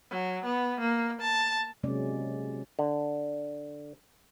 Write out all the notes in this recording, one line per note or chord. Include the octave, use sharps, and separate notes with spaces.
F#3
B3
A#3
A5
C3 F#3 G#3 A#3 C#4 D5
D3